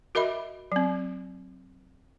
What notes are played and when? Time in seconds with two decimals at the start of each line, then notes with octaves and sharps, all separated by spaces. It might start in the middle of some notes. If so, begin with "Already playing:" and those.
0.15 F#4 A#4 D#5 E5 B5
0.72 F#3 C4